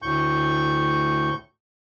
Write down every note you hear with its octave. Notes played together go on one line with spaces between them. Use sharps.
D2 A2 C#6 G6